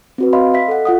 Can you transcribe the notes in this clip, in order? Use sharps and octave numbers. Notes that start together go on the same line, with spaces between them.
C4 F#4 B4
C#5 D#5 F5 B5 C6
D#5 E5 B6
A4 F#5
F4 F#5 D#6